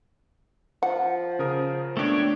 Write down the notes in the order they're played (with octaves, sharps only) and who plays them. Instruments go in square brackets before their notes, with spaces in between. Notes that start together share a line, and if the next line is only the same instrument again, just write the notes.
[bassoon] F3 [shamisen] F#5
[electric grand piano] C#3 A#4 D#6
[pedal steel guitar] A3 G4 C#5 [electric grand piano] B3 D4